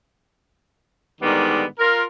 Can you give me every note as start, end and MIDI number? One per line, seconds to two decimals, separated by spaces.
1.21 1.64 44
1.21 1.64 50
1.21 1.64 51
1.21 1.64 55
1.21 1.64 59
1.79 2.03 65
1.79 2.03 70